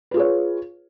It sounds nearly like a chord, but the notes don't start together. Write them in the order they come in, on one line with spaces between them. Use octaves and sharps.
B4 F4 G#4 C#5